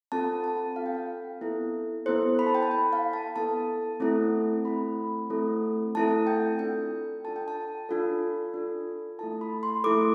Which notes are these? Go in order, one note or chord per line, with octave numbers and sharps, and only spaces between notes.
C4 F4 A4 A5
A5
C4 F4 A4 F5
G5
F5
B3 E4 A4
B3 E4 A4 C5
B5
A5
G5
A5
B3 E4 A4 G5
F5
A5
B3 E4 A4 A5
A3 C4 E4 A4
A3 C4 E4 A4 B5
A3 C4 E4 A4
A3 C4 E4 A4 A5
G5
D4 F4 A4 G5
D4 F4 A4 A5
G5
A5
D4 F4 A4
D4 F4 A4
A3 E4 A4 A5
B5
C6
A3 E4 A4 D6